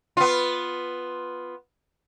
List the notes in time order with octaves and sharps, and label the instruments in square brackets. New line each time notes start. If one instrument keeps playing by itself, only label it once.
[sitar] B3 F4